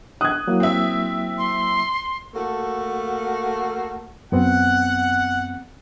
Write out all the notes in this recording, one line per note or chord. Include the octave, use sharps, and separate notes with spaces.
D#6 F#6 G#6
F#3 A#3 E4
C4 E5
C6
A3 A#3 F#4 A4
F#2 B3 C4 F#5